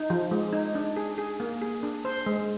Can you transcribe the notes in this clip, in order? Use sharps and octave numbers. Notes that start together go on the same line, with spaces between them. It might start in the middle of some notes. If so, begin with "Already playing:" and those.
Already playing: D#4
F3
G#3
D#4
D4
G#4
G#4
A#3
G#4
D4
C5
G#3